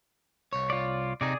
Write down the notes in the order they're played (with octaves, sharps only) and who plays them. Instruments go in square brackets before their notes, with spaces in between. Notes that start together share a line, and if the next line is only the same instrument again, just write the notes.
[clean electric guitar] C2 C#5
[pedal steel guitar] F4 D5
[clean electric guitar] C3 D#4 [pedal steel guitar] G#4 D5